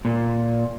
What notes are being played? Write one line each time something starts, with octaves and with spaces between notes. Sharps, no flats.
A#2